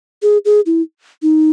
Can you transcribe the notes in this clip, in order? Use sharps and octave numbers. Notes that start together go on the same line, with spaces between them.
G#4
G#4
E4
D#4